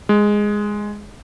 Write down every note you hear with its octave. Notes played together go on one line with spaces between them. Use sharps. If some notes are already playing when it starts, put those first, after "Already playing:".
G#3